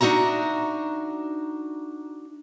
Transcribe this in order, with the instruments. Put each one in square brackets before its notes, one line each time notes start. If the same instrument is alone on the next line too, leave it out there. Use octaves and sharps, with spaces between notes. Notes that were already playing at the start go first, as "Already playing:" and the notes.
[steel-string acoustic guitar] D4 D#4 F#4 E5 A#5